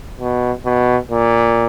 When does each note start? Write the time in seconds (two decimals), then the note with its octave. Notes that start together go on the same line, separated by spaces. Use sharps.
0.20 B2
0.65 B2
1.11 A#2